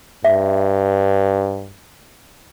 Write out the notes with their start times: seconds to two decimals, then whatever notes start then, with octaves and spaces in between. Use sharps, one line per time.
0.25 G2 E5